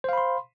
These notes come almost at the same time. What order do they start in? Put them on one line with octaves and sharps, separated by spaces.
C5 F5 B5 C6